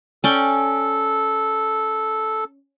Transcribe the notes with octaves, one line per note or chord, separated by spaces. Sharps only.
C#4 A4 D5 G5